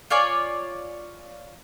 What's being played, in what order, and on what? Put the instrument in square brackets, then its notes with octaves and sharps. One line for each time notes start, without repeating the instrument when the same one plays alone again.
[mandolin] F4 C#5 D5 G#5